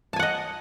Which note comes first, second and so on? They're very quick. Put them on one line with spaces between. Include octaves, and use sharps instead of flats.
A5 G#5 F#5 D#5